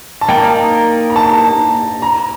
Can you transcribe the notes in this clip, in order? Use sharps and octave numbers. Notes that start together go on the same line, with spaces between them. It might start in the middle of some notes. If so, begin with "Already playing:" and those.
A5
A#3 D#4 A#4 D5 G5
A#5
A5
A#5